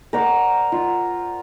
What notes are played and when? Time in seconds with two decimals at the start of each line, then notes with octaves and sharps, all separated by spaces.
0.13 A#4 C5 D5 F#5
0.72 F4